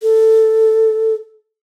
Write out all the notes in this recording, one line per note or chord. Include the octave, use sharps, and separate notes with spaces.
A4